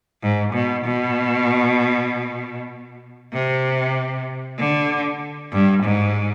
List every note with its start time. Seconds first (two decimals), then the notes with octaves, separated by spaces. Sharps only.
0.22 G#2
0.54 B2
0.85 B2
3.33 C3
4.58 D3
5.52 G2
5.83 G#2